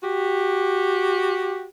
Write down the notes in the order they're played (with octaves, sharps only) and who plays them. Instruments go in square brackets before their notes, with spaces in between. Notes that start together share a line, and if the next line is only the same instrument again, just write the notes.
[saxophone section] F#4 G4